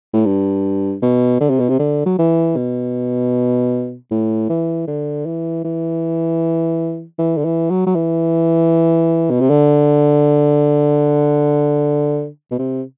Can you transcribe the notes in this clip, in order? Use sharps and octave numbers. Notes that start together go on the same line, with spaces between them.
A2
G2
B2
D3
C3
B2
C3
D3
F#3
E3
B2
A2
E3
D3
E3
E3
E3
D3
E3
F#3
F#3
E3
B2
C3
D3
B2
C3